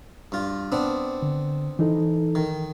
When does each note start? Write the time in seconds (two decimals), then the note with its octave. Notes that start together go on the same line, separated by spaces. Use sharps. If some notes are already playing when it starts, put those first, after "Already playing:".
0.32 G2 F4
0.72 B3 C4 D4
1.22 D3
1.79 E3 D#4 A4
2.35 D#3